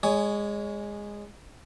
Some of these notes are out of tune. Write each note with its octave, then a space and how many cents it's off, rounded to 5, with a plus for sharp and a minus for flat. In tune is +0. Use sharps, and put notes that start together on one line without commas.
G#3 -15 C#5 +25 G#5 +0